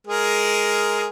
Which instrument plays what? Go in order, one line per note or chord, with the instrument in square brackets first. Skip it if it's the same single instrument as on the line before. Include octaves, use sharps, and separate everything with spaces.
[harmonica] G#3 G#4 A#4